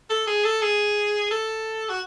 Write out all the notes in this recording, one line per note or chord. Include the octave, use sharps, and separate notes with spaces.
A4
G#4
A4
G#4
A4
F#4